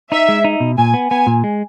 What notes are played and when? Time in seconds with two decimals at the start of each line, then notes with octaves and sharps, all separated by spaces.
0.12 D#4 E5
0.29 G#3
0.45 D#4
0.60 B2
0.78 A#2 G#5
0.94 B3
1.11 B3 G#5
1.27 A#2
1.44 G#3